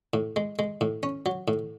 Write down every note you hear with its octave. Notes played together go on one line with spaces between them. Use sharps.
A2
G#3
G#3
A2
C#4
F#3
A2